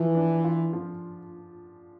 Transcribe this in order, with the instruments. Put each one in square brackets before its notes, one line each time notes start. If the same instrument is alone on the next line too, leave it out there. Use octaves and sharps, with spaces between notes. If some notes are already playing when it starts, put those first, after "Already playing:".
Already playing: [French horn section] E3 [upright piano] F3
[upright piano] D4
F4
F3